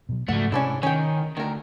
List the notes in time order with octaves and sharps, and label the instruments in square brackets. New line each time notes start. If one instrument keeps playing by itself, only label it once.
[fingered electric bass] B2 F#3
[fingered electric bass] G#2 C#3 F3 [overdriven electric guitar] A3 F#4 [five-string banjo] F#5
[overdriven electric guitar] G#2 [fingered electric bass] C3 [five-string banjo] C#4 D4 E4
[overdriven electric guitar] D#3 [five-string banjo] C#4 G5
[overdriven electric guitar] D2 [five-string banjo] D#3 A#4